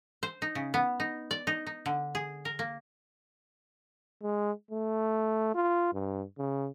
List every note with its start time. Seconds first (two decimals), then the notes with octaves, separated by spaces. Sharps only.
0.23 C5
0.42 D#4
0.55 C#3
0.74 B3
1.00 D#4
1.31 D5
1.47 D#4
1.67 D#4
1.86 D3
2.15 G#4
2.45 A#4
2.59 A#3
4.23 G#3
4.71 A3
5.55 F4
5.93 G2
6.38 C#3